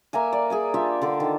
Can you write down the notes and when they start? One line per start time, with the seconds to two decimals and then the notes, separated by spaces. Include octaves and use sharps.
0.13 A#3 A#4 E5 G#5
0.33 D5
0.50 G#4 E5 G#5
0.74 D4 F4 G4 E5
1.02 D3 A4 D5
1.20 D#3